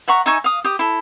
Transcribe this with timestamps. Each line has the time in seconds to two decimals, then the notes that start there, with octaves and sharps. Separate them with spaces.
0.08 E5 F#5 A#5 C#6
0.26 D#4 E5 G#5 C#6
0.44 F5 D#6
0.64 G4 D#6
0.79 E4 A4